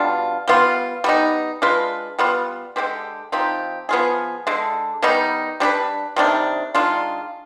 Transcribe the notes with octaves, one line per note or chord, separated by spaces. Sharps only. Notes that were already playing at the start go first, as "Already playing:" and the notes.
Already playing: B2 G3 D4 F4
G3 B3 F4
G3 B3 D#4
G#3 D4 F4 B4
G3 B3 F4
D3 G#3 C4 G4
F3 C4 D#4 G4
F3 B3 F4 G#4
D3 G#3 D4
D#3 G3 B3 D#4
G3 D4 G#4 B4
C3 D#3 G3 D4
D#3 G#3 D4 F4